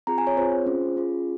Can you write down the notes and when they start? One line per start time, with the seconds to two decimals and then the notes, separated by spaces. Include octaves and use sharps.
0.07 C4 F4 G#4 A#5
0.18 G#5
0.27 C#5
0.37 C4 F4 G#4 C5
0.66 C#4 F4 G#4
0.96 C#4 F4 G#4